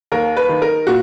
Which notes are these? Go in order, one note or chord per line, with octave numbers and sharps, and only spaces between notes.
D#2 A#4
B4
D#3
A#4
A#2 F#4